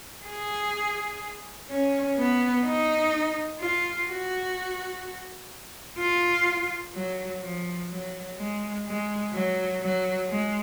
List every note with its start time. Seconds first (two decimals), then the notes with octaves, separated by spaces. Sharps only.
0.25 G#4
1.69 C#4
2.17 B3
2.65 D#4
3.60 F4
4.08 F#4
5.99 F4
6.94 F#3
7.41 F3
7.89 F#3
8.37 G#3
8.86 G#3
9.33 F#3
9.81 F#3
10.29 G#3